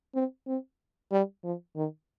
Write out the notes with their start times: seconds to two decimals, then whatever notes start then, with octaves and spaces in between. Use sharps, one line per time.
0.15 C4
0.47 C4
1.12 G3
1.44 F3
1.76 D#3